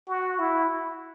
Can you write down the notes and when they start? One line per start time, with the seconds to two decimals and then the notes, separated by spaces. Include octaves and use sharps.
0.08 F#4
0.39 E4